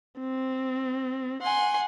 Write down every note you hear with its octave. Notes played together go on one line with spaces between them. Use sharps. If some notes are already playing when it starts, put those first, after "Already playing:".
C4
F#5 G#5 C6